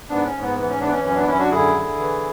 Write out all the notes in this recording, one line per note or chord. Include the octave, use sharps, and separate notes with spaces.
G#2 B3 D4
C#4
G#2
B3
E3 B3
C#4
E3 B3 D4
C#4
F#2 C#4
B3 D4
F#2 C#4 E4
D4 F#4
D3 E4 G#4
D3
E3